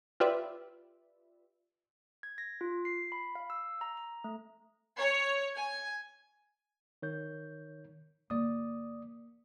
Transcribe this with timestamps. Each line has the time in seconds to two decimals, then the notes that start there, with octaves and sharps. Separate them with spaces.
0.20 F4 G4 B4 D5 E5
2.23 G#6
2.38 A#6
2.61 F4
2.85 C7
3.12 B5
3.35 F5
3.50 E6
3.81 A#5
3.97 A#5
4.24 A3
4.98 C#5
5.56 G#5
7.02 D#3 C#5 G6
8.30 G1 A#3 D5 D#6